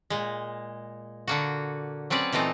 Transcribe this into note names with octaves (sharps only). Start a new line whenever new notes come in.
A#2 G#3
D3 A#3 F#4
F#3 C4 C#4 B4 D5
A#2 E3 A3 C4 D#4